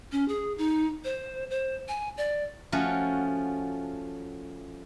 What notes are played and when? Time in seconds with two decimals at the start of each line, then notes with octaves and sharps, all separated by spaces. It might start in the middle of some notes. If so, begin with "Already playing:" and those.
0.12 C#4
0.28 G#4
0.58 D#4
1.04 C5
1.50 C5
1.88 G#5
2.17 D5
2.72 F3 A3 C#4 F#4